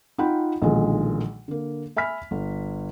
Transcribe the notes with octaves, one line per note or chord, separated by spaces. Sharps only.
D#4 F4 F#5 G5 B5
B1 A#2 D3 D#3 F3 G#3
D3 A#3
E5 G#5 B5 F6 B6
G1